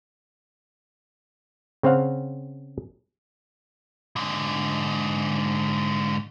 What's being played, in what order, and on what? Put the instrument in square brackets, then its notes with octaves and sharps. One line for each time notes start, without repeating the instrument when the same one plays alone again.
[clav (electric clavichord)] C#3 C4 C5 F5 F#5
[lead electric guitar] G#2 D3